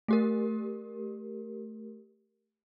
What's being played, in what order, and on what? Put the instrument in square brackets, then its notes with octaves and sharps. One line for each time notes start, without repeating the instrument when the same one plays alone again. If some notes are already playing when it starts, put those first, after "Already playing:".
[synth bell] A3 G4 A#4